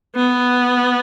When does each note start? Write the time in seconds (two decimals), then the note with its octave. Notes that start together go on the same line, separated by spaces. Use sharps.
0.16 B3